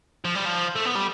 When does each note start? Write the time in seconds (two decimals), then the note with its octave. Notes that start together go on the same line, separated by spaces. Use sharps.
0.25 F3
0.35 G3
0.45 F3
0.76 A3
0.85 B3
0.95 G3